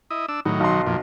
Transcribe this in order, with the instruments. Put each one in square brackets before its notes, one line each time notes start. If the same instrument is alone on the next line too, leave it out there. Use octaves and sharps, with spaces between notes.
[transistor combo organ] E4 D#5
D4 E6
[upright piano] A2 [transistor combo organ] D#3 F#3
[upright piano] B1 C6
[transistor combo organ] F2 A#2